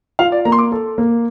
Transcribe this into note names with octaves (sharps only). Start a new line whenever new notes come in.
F4 F5
D5
A#3 A#5
C6
D6
A4
A#3